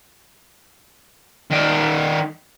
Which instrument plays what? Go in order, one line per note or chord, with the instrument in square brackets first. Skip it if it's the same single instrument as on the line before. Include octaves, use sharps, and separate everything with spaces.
[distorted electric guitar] D#3 D5